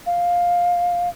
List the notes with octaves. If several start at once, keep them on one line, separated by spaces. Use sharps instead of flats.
F5